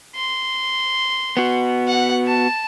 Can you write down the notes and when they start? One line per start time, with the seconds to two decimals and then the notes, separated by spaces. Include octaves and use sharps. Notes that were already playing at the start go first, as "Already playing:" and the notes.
0.16 C6
1.37 B3 F#4
1.88 F#5
2.26 A5